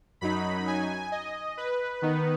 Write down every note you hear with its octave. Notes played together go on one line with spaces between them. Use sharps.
F#2 F#3 D#4 B5
G#5
D#5
B4
D#3 B3 D#4